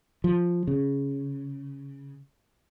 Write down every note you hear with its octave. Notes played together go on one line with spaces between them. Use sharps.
F3
C#3